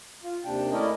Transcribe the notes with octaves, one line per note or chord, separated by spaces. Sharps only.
F4
D#2 C3 D4 G5
A3 C#4 E4 A#4 D5 D#5